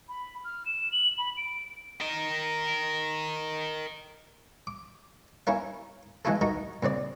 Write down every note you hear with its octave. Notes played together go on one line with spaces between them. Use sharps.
B5
F6
E7
F#7
B5
D7
A#4 D#5
D6
C#4 E4 A#4 F5
E3 G#3 A3 E4 F4 A4
A3 D#4 F#4 A#4
A#2 C#3 C4 D5